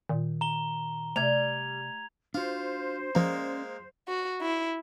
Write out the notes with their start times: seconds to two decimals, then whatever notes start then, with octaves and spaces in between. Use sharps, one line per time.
0.09 A#2 D#3
0.41 A#5 G7
1.16 C3 G3 A3 G#6 F7
2.34 D4 F4 F#4 C5
3.15 F3 G#3 A#3 C#4 D5 A#5
4.08 F#4
4.42 E4